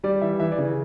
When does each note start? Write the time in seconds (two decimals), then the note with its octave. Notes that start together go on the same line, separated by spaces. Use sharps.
0.04 G3 D5
0.21 E3 E5
0.40 E3 E5
0.52 D5
0.58 C#3